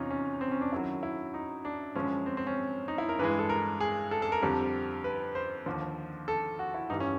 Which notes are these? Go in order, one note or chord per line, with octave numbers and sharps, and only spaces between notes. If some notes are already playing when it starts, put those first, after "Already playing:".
Already playing: E2 C3 C#4 D#4 F4
C#4
C4
C#4
D4
F#2 D#3 F#3 E4
E4
D#4
D4
F#2 D3 F3 G#3 C#4
C4
C4
C#4
D#4
E4
A#4
G2 E3 G#3 B4
A4
A#4
G#4
A4
A4
A#4
F2 D3 G3
B4
C5
D#2 D3 F3
A4
F#4
E4
G2 E3 G3 D#4
C#4